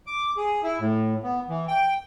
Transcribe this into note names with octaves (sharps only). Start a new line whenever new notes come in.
D6
G#4
E4
A2
B3
E3
G5